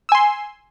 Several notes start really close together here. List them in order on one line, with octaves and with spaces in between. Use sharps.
E6 G#5 C6